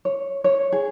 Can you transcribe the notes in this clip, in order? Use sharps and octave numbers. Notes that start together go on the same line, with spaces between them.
C#5
C#5
G#4